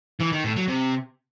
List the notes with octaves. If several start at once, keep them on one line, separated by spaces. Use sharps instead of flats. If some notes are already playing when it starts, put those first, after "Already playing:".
E3
D#3
A2
F#3
C3